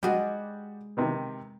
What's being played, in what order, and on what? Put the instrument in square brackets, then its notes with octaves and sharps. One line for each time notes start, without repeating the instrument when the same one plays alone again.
[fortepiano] G3 F#4 [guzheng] G#3 G#4 D5
[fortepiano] C3 D#3 E3